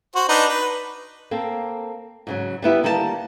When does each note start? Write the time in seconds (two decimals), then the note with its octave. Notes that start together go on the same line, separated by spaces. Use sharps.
0.15 F#4 C5
0.29 D4 D#4 B4
0.49 B4
1.31 A#3 C4 A4
2.27 G#2 C#3 F#3
2.62 G3 B3 E4 G4
2.83 D2 D#3 G3 A#3 A#4 A5